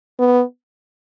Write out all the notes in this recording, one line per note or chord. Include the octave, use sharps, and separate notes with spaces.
B3